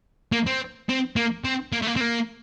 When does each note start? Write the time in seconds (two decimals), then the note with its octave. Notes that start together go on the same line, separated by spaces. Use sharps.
0.32 A#3
0.46 C4
0.89 C4
1.16 A#3
1.45 C4
1.73 A#3
1.82 A3
1.87 A#3
1.96 C4
2.01 A#3